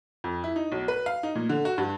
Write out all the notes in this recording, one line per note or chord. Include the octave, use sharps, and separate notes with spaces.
F2
E4
D#4
B1
B4
F5
D#4
A#2
D3
F#4
G2